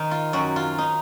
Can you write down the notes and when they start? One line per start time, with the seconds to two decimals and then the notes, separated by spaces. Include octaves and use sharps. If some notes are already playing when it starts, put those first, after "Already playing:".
Already playing: D#3 D#4
0.11 F4
0.33 F#2 F#4
0.56 F4
0.78 D#4